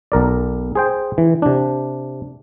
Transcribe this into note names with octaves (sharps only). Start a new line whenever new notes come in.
B1 A#4 D5
G#4 C5 G5
E3
C3 D4